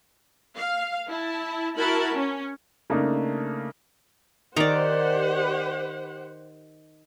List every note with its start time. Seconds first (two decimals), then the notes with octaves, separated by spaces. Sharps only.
0.57 F5
1.08 E4 A5
1.77 E4 F#4 A#4 A5 B5
2.15 C#4
2.90 C#3 A3 A#3 D4 D#4
4.56 D#3 G4 C5 D5 F#5 A#5